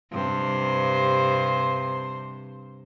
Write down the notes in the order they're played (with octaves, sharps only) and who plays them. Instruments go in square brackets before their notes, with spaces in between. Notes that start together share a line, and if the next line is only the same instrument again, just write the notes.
[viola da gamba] G2 C3 C5